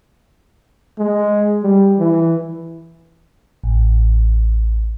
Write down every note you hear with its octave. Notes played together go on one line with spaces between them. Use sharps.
G#3
G3
E3
A1